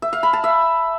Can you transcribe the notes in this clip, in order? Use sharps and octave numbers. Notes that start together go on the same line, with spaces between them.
E5
F5
B5
A5
E5